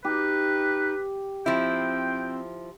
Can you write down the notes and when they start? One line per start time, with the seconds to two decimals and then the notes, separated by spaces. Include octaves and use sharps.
0.05 D#4 G4 B4
1.46 F3 C4 E4 G5